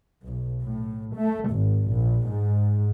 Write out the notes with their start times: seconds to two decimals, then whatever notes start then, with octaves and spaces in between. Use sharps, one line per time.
0.24 B1
0.62 A2
1.15 A3
1.50 G#1
1.90 A#1
2.25 G#2